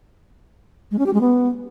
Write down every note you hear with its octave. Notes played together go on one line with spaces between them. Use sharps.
G#3
C#4
G4
G#3
B3